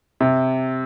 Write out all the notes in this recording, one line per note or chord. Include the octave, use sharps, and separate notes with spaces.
C3